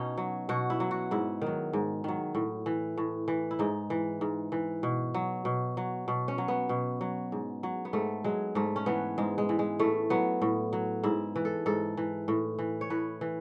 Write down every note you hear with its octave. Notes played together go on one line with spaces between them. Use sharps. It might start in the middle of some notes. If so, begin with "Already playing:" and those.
Already playing: B2 C#4 D#4
F#3
B2 F#4
E4
F#3
F#4
G#2 E4
D#3
F#3
G#2
D#3 F#3
A2
E3
A2
E3
E4
G#2 D#4
E3
G#2
E3
B2
F#3
B2
F#3
B2
C#4
F#3
B3
B2
F#3
G#2
F#3
B3
G#2 A3
F#3 G#3
G#2 A3
C#4
E3 B3
G#2 G#3
G#3
E3
G#3
A2 A3
F#3 B3
A2
F#3
G#2 E4
E3
A4
G#2 A4
E3
A2
E3
C#5
A2 B4
E3